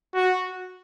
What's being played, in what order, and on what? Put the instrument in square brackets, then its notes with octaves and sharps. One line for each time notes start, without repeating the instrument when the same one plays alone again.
[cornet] F#4